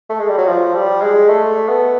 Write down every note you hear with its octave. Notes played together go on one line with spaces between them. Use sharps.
A3
G#3
G3
F#3
F3
G3
G#3
A3
B3